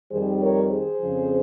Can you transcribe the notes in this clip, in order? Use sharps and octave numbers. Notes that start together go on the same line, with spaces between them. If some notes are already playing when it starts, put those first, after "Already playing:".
F2 D#3 G3 G#4 C5
A#4 C#5
G#4 C5
F2 C#3 F3